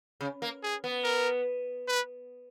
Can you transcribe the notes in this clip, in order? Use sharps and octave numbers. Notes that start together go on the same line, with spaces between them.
C#3
A#3
G#4
B3
A#4
B4